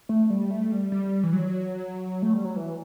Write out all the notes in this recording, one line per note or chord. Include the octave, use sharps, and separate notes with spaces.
A3
G3
A3
G3
G3
E3
F#3
A3
G3
F#3
E3